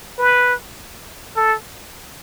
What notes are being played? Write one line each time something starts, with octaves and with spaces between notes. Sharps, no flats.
B4
A4